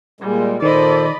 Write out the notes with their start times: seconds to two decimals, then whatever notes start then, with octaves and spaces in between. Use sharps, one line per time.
0.21 A#2 G3 G#3
0.62 A#2 D#3 A4 C5 D5 D#5 B5